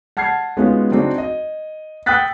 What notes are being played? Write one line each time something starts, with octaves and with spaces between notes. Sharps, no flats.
F#5 A5 F6 G#6 C7
G#3 B3 C#4 D#4 F4 F#4
F#3 C4 D4 D#4 F#4
D#5
G5 D#6 E6 F#6 A6 B6